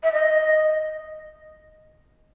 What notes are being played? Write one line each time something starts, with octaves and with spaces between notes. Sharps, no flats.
E5
D#5